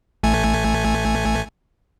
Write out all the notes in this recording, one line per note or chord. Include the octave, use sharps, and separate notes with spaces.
A1 A3 G#5